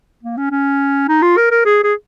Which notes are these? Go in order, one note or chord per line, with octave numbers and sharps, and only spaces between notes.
A#3
C#4
C#4
D#4
F4
A#4
A#4
G#4
G#4